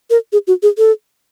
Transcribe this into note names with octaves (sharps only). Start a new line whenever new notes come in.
A#4
G#4
F#4
G#4
A4